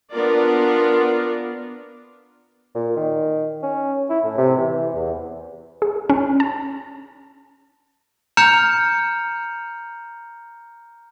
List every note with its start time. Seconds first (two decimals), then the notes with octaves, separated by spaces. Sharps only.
0.11 B3 D4 F4 A#4 D5
2.75 A#2
2.97 D#3
3.63 C#4
4.10 E4
4.24 A2
4.38 C3
4.57 E3
4.94 E2
5.82 G#4
6.10 C#4
6.40 A5
8.37 A#5 F6 G6 C#7 F7